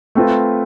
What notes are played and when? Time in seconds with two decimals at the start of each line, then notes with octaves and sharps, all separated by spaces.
0.15 A3 C4 F4 B4